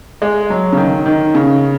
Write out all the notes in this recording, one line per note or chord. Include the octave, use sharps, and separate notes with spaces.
G#3
F#3
C#3
D#3
D#3
C#3